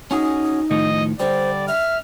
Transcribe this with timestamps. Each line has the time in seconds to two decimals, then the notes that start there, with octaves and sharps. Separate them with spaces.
0.11 C#4 D#4 F#4 G#4
0.71 A2 D#3 F3 D#5
1.20 D3 G3 C5 D5
1.68 E5 F6